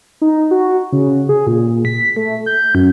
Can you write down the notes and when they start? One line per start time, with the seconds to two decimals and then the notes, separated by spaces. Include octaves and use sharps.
0.22 D#4
0.51 F#4
0.92 C#3
1.29 G#4
1.47 A#2
1.85 B6
2.16 A3
2.46 G6
2.75 F#2